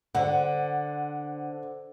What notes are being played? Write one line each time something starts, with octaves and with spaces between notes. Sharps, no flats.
D3 C5 F#5